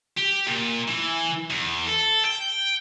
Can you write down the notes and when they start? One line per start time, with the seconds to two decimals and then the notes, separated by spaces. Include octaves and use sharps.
0.17 G4
0.47 A#2
0.88 E3
1.50 E2
1.87 A4
2.25 G5